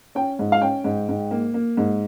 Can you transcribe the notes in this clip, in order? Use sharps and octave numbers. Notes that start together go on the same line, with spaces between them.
C#4 G5
G#2
F5
C#4 G5
G#2
G#2
A#3
A#3
G#2